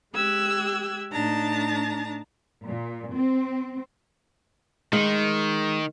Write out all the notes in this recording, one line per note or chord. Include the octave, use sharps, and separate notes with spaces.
G#3 G4 E6 F#6 G#6
A2 D4 D#4 A5 A#5
A#2
C4
D#3 G#3